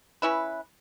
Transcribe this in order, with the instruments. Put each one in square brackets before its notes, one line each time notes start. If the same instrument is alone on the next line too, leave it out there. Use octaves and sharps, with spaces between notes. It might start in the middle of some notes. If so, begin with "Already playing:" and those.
[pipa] C#4 E4 B4